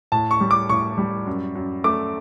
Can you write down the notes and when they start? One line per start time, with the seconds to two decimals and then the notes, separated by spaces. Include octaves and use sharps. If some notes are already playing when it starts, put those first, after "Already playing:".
0.12 A2 A5
0.31 C#6
0.41 G3
0.51 D6
0.69 A2 C#6
0.98 G3
1.26 F#2
1.55 F#2
1.84 A3 D6